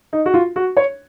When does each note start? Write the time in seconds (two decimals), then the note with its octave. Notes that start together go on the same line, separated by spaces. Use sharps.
0.13 D#4
0.26 F#4
0.34 F4
0.56 F#4
0.77 C#5